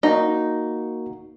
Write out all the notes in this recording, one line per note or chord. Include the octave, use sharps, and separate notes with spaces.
A#3 D#4 F#4